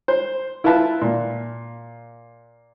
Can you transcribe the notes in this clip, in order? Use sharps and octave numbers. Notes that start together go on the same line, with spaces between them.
C5
E4 F4 B4 E5 A5
A#2